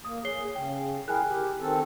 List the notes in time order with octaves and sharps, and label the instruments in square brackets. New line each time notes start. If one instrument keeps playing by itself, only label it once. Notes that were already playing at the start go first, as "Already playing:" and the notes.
[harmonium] A#3 [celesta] D#6
[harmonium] G#4 [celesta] C#5 C7 G7
[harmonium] C#3 [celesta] G5
[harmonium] E4 G#4 A#4 [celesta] G5 G#5 F#6
[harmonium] G4
D#3 C4 A4